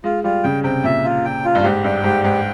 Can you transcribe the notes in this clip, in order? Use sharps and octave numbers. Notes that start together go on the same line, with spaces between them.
G#3 F4
G3 F4
C#3 G5
C3 G5
A#2 E5
F4
G5
F4
G2
G#2 G4
G2 G5
G#2 G4
G#2 G5